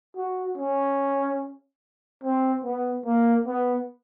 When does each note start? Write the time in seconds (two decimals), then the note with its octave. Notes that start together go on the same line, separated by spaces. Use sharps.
0.17 F#4
0.58 C#4
2.24 C4
2.65 B3
3.06 A#3
3.47 B3